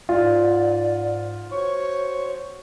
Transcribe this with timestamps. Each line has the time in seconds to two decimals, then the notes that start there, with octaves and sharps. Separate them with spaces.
0.09 G#2 F4 D5
1.51 F#4 C5 C#5 C#6